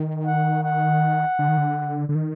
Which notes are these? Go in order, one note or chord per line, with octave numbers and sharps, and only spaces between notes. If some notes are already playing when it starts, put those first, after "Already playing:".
Already playing: D#3
F#5
F#5
D3
D#3
D3
D3
D#3